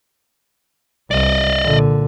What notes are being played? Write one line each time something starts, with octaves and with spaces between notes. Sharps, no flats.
C2 D5 D#5
A#2 D3